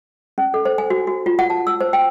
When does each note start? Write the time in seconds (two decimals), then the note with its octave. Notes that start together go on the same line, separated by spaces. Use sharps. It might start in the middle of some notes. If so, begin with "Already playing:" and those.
0.38 C#4
0.54 A4
0.65 C5
0.78 G#5
0.90 F#4
1.07 F#4
1.26 F4
1.39 F#5
1.50 A5
1.67 E6
1.81 C5
1.93 G5